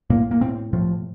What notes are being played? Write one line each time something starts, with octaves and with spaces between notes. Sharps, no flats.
A2 A#3
A#3
A2 C4
A2 F3